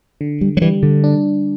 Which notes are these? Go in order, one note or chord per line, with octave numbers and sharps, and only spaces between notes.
D3
G3
F#3
E3 G3
D3
D4